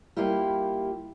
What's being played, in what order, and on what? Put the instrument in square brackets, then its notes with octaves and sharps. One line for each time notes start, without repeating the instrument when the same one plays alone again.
[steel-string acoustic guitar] G3 A#3 E4 F4 G4